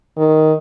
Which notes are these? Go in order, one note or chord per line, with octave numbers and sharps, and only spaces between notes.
D#3